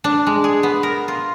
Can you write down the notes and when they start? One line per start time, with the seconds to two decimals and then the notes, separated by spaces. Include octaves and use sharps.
0.04 D4
0.27 G#3
0.44 G#4
0.63 B3
0.83 A#4
1.08 F4